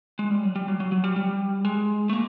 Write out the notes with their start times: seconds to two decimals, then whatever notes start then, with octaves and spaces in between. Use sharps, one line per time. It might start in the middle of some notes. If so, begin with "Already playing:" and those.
0.19 G#3
0.31 G3
0.43 F#3
0.56 G3
0.68 F#3
0.80 F#3
0.92 F#3
1.04 G3
1.16 G3
1.65 G#3
2.10 A3
2.13 A#3